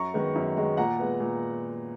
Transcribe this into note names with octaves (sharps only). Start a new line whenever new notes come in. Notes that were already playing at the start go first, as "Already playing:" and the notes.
Already playing: F#2 A#5 C#6
D#3 G#3 B3
F#2
D#3 G#3 B3
A#2 F#5 A#5
G#3 B3
A#2